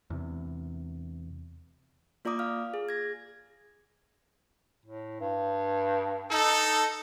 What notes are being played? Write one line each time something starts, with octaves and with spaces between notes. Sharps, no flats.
E2 C3
A#3 F4 D5 A#5 D6 D#6
F5 F6
G#4
G#6 A#6
A2
G2
D#4 A4